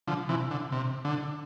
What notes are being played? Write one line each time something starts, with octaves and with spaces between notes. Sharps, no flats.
D3 F3
C3 E3
D3
C3
D3